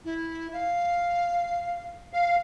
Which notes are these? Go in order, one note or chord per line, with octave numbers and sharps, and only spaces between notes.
E4
F5
F5